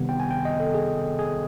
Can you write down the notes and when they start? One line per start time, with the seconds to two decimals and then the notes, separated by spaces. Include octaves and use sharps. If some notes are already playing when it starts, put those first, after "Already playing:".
Already playing: C3 D#3 G3 B3
0.09 G5
0.20 G#5
0.31 G5
0.45 D#5
0.60 A4
0.74 G#4
1.19 G#4